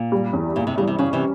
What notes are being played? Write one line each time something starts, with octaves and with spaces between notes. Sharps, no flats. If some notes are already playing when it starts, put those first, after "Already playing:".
Already playing: A#2
G3
E2
A#2 E4
C3
C#3 G3
C3
C#3 C#4
C3 E3